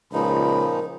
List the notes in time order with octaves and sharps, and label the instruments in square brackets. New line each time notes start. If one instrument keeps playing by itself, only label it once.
[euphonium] C#2 [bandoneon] A#2 F3 D#4 [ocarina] A#4 [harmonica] B5